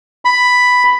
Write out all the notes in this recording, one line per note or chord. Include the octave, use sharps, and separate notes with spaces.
B5